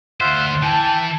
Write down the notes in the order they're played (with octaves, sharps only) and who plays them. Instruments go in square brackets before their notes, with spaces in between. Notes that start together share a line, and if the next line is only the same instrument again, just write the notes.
[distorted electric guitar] D2 C5 [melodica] F4 E5 F#5
[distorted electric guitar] E3 [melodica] G5 [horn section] A5